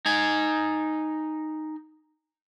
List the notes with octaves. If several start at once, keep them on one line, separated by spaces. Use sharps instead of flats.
D#4 G#5